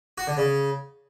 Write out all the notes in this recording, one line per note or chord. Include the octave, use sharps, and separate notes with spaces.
F#4
D3
C#3